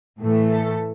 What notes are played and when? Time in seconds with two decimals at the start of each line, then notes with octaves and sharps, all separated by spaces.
0.19 A2 E3 A3
0.50 A4